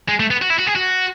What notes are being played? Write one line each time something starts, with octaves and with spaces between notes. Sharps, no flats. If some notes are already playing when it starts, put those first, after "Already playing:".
G#3
A3
B3
F#4
E4
F#4
G#4
F#4